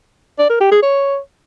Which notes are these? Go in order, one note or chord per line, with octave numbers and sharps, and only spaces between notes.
D5
A#4
G4
G#4
C#5